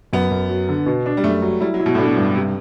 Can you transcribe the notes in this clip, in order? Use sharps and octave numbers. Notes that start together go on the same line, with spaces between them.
F#2 B3
F#2
F#3
D3
B2
D4
G3
F#2 A3
F#3
G3 E4
F#3
E4
B2
A2
B2 D4
G2
C3